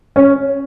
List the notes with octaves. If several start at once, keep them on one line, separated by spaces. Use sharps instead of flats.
C#4